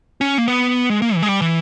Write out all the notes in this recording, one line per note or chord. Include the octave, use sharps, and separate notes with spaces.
C#4
A#3
B3
G#3
A#3
E3
G#3
G3
E3